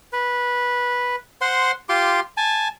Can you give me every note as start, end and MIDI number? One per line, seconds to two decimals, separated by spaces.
0.13 1.16 71
1.41 1.72 72
1.41 1.72 78
1.41 1.72 84
1.89 2.20 65
1.89 2.20 67
1.89 2.20 84
1.89 2.20 86
2.37 2.68 80
2.37 2.68 81